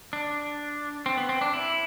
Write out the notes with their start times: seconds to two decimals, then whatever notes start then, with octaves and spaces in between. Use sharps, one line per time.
0.13 D4
1.06 C4
1.17 B3
1.29 C4
1.41 D4
1.54 E4